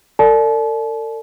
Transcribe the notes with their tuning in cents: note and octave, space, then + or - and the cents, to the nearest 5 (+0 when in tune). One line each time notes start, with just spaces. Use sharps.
A4 +45 D5 +0 A5 -40